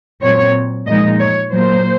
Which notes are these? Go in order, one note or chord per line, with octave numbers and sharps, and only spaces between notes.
A#2 F#3 C4 C#5
A#2 F3 G#3 D#4 D#5
C#5
A#2 F#3 A#3 C5